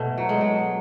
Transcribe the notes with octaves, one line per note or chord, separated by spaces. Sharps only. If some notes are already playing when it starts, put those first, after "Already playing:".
Already playing: B2 A3
F#3
G#3
F#3